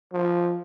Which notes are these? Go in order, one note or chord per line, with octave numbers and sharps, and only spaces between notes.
F3